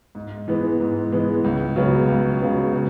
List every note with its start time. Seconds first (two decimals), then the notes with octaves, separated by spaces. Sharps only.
0.15 G#2
0.48 E3 G#3 B3
0.80 G#2
1.12 E3 G#3 B3
1.44 C#2
1.76 C#3 F#3 B3
2.09 C#2
2.41 C#3 F#3 B3
2.73 C#3